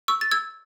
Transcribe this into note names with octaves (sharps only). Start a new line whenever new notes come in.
C#6 E6
A6
E6 G#6